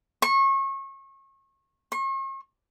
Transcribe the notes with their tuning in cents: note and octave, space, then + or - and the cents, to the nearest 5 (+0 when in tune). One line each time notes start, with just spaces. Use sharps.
C#6 -30
C#6 -45